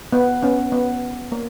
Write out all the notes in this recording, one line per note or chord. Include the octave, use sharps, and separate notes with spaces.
B3
B3 C#4
B3
A#3